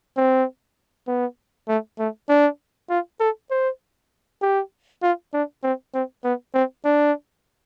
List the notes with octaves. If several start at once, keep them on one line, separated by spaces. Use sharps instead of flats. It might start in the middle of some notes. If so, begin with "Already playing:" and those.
C4
B3
A3
A3
D4
F4
A4
C5
G4
F4
D4
C4
C4
B3
C4
D4